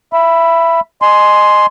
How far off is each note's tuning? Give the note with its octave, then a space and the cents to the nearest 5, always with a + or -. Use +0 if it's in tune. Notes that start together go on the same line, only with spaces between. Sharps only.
E5 +20 B5 +0
D#5 -20 G#5 +15 C6 +0